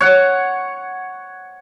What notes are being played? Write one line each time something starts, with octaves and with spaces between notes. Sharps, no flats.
C#5 F#5